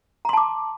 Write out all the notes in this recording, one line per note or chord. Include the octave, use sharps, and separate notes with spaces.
A5 A#5 C6 D6